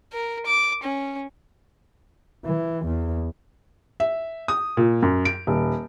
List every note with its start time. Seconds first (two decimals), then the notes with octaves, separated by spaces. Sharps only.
0.13 A#4
0.46 D6
0.83 C#4
2.46 E3
2.86 E2
4.00 E5
4.48 D#6
4.77 A#2
5.02 F#2
5.25 D7
5.47 D#1